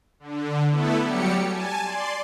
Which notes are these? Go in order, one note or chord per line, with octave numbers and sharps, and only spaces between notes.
D3
A3 B3 E4 A4
F#3 G3 G4 C#7
G#5 A5
D5 C6